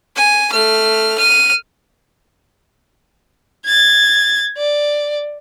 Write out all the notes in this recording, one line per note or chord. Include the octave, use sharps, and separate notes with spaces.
G#5
A3 F6
F6 D#7
G#6 A6
D5